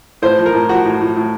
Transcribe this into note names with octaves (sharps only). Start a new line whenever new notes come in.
A2 C5
F3
A#4
A2
F3 F#4
A2
A2
A2